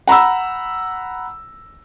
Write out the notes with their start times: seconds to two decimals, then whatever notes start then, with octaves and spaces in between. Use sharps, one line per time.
0.07 F#5 A#5 B5 E6